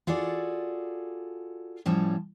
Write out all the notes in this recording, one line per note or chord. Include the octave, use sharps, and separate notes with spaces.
F4 F#4 G#4 A4 D5
A2 F3 G3 C#4 A5